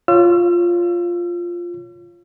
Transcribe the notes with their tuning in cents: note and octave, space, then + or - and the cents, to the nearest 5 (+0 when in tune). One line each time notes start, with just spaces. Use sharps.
F4 +0 C#5 +0 E6 +40